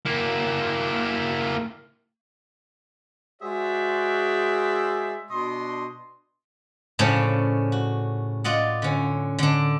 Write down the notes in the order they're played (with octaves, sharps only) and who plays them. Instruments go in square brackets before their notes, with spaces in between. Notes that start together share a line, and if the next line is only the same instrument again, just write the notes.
[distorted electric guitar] A#3 E4
[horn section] G#3 F#4 G#4 C5 D5 E5
B2 D4 D#5 C6
[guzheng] A2 C#3 F3 C#4 D4
F#4
F4 D5 D#5 F#5
D3 C#4
D3 D4